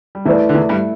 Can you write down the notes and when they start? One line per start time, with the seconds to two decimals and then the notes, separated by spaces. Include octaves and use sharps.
0.15 G3
0.25 E2 E3 A3 E4 B4 D5
0.49 D3
0.54 E2 E3
0.69 G2 G3